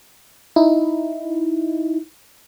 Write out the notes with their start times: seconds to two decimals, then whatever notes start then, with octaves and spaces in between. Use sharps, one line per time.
0.56 D#4 E4